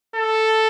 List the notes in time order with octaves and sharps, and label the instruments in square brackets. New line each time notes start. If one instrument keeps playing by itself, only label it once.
[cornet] A4